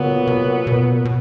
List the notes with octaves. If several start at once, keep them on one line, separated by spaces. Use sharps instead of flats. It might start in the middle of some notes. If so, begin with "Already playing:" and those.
Already playing: A#2 C#3 F#3 B3
C3
B2
B2